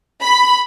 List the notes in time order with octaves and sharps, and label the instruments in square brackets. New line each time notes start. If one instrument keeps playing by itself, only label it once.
[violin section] B5